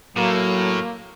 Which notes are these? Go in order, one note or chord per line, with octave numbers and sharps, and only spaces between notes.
A2 F#3 A#3